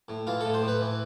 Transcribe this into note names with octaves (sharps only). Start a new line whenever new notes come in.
A2
E3 F4
A2 A4
C5
A2 B4
E3